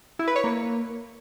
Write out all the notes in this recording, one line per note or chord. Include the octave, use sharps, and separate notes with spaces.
E4
B4
C#5
A#3